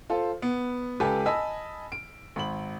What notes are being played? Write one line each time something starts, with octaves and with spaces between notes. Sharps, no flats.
F4 A4 C5
B3
C#2 G4 A4 B4 G#5
D#5 G#5 A5 B5 E6 B6
D7
G#1 B5 F#7